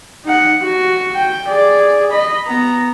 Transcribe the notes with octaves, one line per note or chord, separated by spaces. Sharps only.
D#4 F#5
F#4
G5
G#4 D5
D#5 B5
B3 A#5